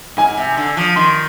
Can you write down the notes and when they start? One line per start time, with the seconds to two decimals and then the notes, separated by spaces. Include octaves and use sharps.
0.17 G#2 G#5
0.37 C3
0.57 D3
0.77 F3
0.96 D#3 C6